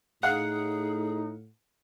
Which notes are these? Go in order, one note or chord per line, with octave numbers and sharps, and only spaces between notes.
A2 D#4 G#4 F5 F#5